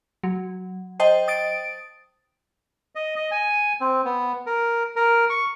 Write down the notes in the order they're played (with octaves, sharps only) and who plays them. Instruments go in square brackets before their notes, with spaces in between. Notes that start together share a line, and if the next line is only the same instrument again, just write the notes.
[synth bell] F#3
C5 D#5 G5 A5
D#6 A6 D7
[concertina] D#5
D#5
G#5
C4
B3
A#4
A#4
C#6